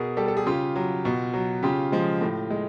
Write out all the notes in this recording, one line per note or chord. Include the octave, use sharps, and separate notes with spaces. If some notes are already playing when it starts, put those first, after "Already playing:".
Already playing: B2 G#4 A#4
G3 G4 A4
A4
G#4
C#3 F4 G4
F#3
B2
F#3
C#3 F4 G4
F3 G#3
A2
G#3